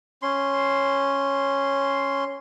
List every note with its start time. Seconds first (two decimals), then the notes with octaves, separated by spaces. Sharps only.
0.22 C#4 C6